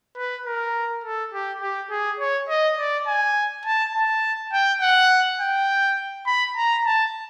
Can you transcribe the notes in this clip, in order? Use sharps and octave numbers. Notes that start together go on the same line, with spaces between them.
B4
A#4
A4
G4
G4
G#4
C#5
D#5
D5
G#5
A5
A5
G5
F#5
G5
B5
A#5
A5